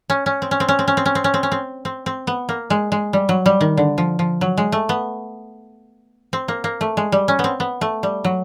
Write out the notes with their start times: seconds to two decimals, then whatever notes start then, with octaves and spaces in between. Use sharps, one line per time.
0.10 C#4
0.26 C#4
0.42 C4
0.51 C#4
0.60 C4
0.68 C#4
0.79 C4
0.88 C#4
0.97 C4
1.06 C#4
1.15 C4
1.24 C#4
1.34 C4
1.43 C#4
1.52 C4
1.85 C4
2.06 C4
2.27 B3
2.49 A#3
2.70 G#3
2.92 G#3
3.13 G3
3.29 F#3
3.46 G3
3.61 D#3
3.77 D3
3.98 F3
4.19 F3
4.41 F#3
4.57 G#3
4.72 A3
4.89 B3
6.33 C4
6.48 A#3
6.64 A#3
6.81 A3
6.97 G#3
7.12 G3
7.28 C#4
7.39 B3
7.44 C4
7.60 B3
7.81 A3
8.03 G3
8.24 F#3